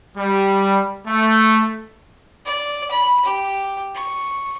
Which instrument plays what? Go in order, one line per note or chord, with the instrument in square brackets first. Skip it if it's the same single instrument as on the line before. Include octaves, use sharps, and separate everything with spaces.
[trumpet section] G3
A3
[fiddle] D5
B5
G4
C#6